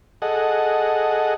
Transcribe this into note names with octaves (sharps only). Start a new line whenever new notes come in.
G#4 A4 D#5 F#5